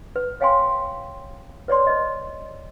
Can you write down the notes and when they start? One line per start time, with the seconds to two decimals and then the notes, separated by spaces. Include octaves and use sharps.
0.16 B4
0.40 B4 C#5 F5 G5 G#5 C6
1.68 B4 C#5 D5 C6
1.87 B4 D#5